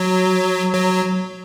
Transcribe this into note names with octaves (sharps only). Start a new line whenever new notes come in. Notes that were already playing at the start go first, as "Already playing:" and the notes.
Already playing: F#3
F#3